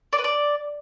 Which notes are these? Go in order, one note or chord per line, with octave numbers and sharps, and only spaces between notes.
D5
B4
D5